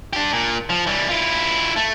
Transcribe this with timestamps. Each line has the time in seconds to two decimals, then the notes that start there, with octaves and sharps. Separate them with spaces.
0.13 D4 G4
0.33 A#2
0.70 F3
0.87 E3 G3
1.09 E4 F4
1.76 A3